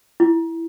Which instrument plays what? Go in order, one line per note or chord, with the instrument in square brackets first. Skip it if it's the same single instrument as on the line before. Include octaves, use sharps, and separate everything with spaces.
[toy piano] E4